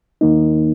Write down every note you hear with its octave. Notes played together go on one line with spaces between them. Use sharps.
D#2 D#3 A#3 D#4